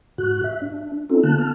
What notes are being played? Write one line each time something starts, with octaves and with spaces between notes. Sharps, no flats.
G#2 F#4 F#6
E5
D4
C4 C#4 D#4 F4 A4
D3 A#3 B3 A5 F#6
A5 F6